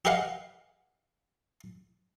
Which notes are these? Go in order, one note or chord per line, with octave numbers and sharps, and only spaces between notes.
G4 G#4 B4 D#5 F5 F#5